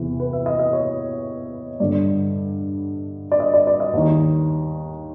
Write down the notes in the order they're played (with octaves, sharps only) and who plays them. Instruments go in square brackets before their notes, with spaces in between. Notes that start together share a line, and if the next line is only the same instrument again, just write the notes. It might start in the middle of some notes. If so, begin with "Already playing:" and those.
Already playing: [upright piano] E2 C3 E3
B4
E5
D#5
D#5
C#5
G2 D3 D5
D5
D#5
D5
D5
D#5
D#2 D#3